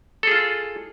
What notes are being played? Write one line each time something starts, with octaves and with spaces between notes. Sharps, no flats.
F4 G#4 A4